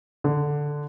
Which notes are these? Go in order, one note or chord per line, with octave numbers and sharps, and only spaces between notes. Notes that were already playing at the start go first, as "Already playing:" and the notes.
D3